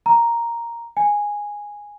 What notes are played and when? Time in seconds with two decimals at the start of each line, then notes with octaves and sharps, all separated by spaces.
0.06 A#5
0.97 G#5